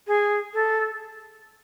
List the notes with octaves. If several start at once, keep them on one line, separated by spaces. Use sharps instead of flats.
G#4
A4